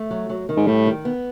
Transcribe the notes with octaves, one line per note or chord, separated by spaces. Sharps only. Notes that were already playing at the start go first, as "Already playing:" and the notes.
Already playing: A3
F#3
F#3
D#3
G#2
A2 G3
D#3
B3